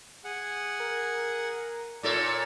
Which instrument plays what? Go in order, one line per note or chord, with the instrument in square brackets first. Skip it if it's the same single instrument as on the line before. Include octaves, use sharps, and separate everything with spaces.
[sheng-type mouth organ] G#4 F#5
[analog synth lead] A#4
[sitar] A#2 A4 C#5 [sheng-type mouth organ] D5